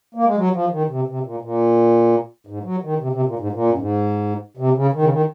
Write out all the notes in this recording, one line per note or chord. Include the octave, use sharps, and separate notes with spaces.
A#3
G#3
F#3
F3
D#3
C3
C3
A#2
A#2
G#2
F#3
D#3
C3
C3
A#2
G#2
A#2
F#2
G#2
C3
C#3
D#3
C#3
D#3